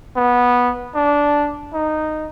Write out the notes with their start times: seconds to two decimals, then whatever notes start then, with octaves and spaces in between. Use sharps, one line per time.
0.16 B3
0.95 D4
1.74 D#4